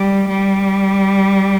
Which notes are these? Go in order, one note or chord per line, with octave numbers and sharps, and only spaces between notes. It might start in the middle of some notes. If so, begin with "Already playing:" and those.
Already playing: G3
G3